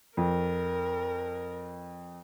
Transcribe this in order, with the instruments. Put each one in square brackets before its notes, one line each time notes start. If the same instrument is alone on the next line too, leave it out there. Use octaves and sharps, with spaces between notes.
[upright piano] F2 [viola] A#4